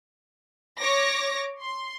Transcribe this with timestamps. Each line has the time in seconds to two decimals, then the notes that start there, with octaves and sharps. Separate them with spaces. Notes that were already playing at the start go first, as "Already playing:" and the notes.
0.79 C#5 D6 A#6
1.62 C6